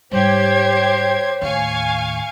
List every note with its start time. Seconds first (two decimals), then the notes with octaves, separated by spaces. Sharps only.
0.11 G#2 G3 G4 C5 C#5 G#6
1.42 D#2 A2 F5 G#5 C#6